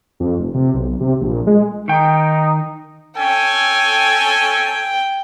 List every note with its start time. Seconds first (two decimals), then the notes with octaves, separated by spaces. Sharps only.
0.20 F2
0.39 F1
0.54 C3
0.74 B1
1.00 C3
1.21 A#1
1.47 G#3
1.88 D#3 D#4 G5
3.17 C#4 A4 G5 G#5